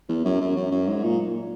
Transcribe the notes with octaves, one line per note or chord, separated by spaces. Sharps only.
E2
F#2
F#2
F#2
F#2
G#2
A#2